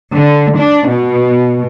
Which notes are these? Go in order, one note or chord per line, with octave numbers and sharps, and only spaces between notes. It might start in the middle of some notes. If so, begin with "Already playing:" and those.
D3
D4
B2